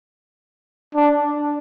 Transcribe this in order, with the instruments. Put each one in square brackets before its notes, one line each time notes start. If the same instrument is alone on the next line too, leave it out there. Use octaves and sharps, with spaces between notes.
[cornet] D4